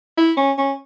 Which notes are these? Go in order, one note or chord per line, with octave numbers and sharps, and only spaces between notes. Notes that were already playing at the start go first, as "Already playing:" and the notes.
E4
C#4
C#4